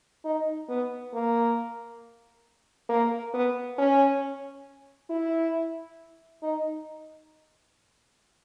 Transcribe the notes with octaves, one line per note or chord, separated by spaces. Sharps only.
D#4
B3
A#3
A#3
B3
C#4
E4
D#4